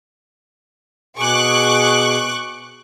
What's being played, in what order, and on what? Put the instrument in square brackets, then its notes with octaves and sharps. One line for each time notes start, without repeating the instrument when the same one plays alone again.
[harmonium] B2 G#4 [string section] C#6 D6 F#6